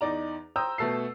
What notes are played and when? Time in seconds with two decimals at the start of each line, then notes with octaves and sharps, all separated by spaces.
0.01 E2 D#4 D5 A#5
0.56 C5 G5 A#5 D#6 E6 G6
0.78 B2 A3 A4 E6 C7